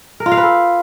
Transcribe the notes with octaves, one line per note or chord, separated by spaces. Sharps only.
A#4
F4
F5
B4
A4